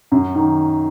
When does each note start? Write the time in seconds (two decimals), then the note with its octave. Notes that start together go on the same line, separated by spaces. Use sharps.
0.12 F#2
0.35 D#3